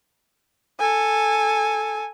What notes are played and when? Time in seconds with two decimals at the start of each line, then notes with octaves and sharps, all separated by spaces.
0.79 A4 G#5